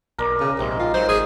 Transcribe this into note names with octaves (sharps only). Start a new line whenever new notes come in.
B1 A#4 D5
C#3
A#1 G#2 C3
F4
F#3 C5
G#1 G#4